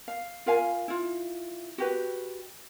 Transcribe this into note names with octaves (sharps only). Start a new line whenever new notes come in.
F5
F4 A#4 F5 G#5
E4 F4
F#4 G4 B4